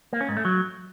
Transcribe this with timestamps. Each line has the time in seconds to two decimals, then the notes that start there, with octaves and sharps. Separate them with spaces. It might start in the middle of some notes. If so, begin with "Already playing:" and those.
0.13 A#3
0.21 C#4
0.29 G#2
0.37 A3
0.45 F#3